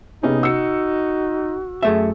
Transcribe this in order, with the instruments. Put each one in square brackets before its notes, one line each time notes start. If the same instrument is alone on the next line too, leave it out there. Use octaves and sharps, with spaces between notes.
[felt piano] C3 B3 C#4 [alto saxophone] D#4 [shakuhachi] G#4
[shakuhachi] F#4 [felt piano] E6 C#7
[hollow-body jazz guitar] F#2 A3 E5 [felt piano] G#4